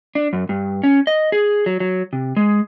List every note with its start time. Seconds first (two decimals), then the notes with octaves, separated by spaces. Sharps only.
0.15 D4
0.33 F#2
0.49 G2
0.83 C#4
1.07 D#5
1.32 G#4
1.66 F#3
1.80 F#3
2.13 C3
2.36 G#3